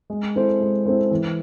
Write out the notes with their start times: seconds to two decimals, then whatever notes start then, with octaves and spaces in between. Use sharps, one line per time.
0.10 G#3
0.36 C4 E4 A4 C5
0.60 G#3
0.86 C4 E4 A4 C5
1.11 E3